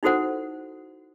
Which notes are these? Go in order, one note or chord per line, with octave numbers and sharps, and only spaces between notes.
D#4 E4 F#4 A4 C5 F#5